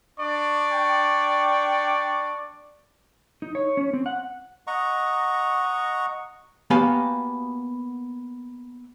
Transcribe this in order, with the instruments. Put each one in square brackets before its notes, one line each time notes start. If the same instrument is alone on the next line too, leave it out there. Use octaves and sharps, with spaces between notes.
[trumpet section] D4 D5 C#6
[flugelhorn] G5
[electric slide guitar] D#4
C#5
C#4
C4
F#5
[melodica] D#5 F#5 A#5 C#6
[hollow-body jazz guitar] A#3 B3 F#4 G4 F5 G#5